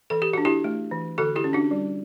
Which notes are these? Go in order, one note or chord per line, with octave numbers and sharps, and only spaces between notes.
E3 A4
G4
D4 F#4
E4 G4
A3
E3
D3 F#4 A4
E4 G4
C#4
D4 F#4
G3